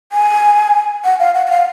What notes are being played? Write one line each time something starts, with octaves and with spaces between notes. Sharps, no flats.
G#5
F#5
F5
F#5
F#5
F5